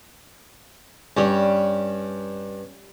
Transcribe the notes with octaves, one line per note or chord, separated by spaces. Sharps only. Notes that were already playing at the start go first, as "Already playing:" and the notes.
G2 G3 C#4